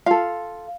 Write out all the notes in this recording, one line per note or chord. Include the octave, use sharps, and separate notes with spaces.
F4 A4 F5